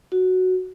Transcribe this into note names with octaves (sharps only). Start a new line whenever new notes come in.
F#4